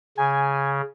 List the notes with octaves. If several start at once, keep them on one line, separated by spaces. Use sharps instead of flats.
C#3 G#5